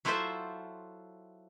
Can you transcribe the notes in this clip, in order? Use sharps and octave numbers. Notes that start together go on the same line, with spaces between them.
F#3 E4 F4 A4 C5 E5